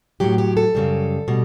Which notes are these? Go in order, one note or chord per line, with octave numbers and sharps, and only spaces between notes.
A2 F#3 G4
G4
A4
F#2 C#3 G3
B2 G3